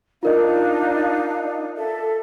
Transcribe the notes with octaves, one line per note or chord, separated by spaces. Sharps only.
D4 D#4 F4 A#4 D#5 F5
A4 E5